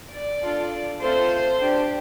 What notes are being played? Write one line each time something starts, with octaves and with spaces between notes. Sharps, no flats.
D5
D4 F4 A4
A3 C4 F4 A4 C5
D4 G4